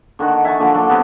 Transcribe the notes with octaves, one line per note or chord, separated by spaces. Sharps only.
D3 D#3 F#4
E5 G#5 A5 C#6
A#2 D3 F3
F#3 A4 C6 D6
C3 B3 A4